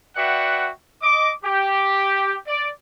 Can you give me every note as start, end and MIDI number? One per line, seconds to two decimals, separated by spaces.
0.16 0.69 66
0.16 0.69 71
0.16 0.69 74
0.16 0.69 76
0.16 0.69 78
0.16 0.69 79
1.02 1.31 75
1.02 1.31 86
1.44 2.36 67
2.47 2.69 74